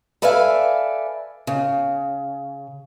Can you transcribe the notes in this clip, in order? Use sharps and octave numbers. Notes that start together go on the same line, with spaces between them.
A4 B4 D5 E5 F5 G#5
C#3